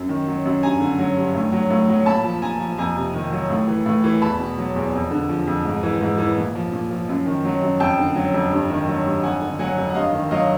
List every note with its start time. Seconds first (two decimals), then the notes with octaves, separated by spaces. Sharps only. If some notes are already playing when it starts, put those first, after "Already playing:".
Already playing: F#2
0.09 D#3
0.27 F#3
0.46 F#2
0.63 G2 G#5 A#5
0.80 D3
0.99 F#3
1.17 G2
1.35 A2
1.52 F#3
1.70 A2
1.89 F#3
2.06 A#2 A5 B5
2.24 F3
2.42 A#2 G#5 A#5
2.60 F3
2.78 F2 G#5 A#5
2.96 C3
3.14 D#3
3.32 F#3
3.50 A2
3.68 E3
3.86 A2
4.04 E3
4.22 E2 A5 B5
4.39 B2
4.58 F#3
4.76 E2
4.93 F2
5.11 D3
5.29 F3
5.47 F2
5.65 G#2
5.83 E3
6.01 G#2
6.18 E3
6.37 A#2
6.55 F3
6.72 A#2
6.91 F3
7.09 F#2
7.26 D#3
7.45 F#3
7.62 F#2
7.80 F2 G5 A5
7.99 D3
8.15 F#3
8.34 F2
8.52 G2
8.70 D#3
8.88 F#3
9.06 G2
9.23 F2 F#5 G#5
9.42 D3
9.59 F#3 F#5 G#5
9.78 F2
9.89 F#5
9.95 G2 D#5 F5
10.13 D#3
10.31 F#3 D#5 F5